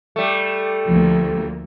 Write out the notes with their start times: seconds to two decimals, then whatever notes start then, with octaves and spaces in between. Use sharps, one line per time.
0.16 G3 A3
0.87 D2 F3 A#3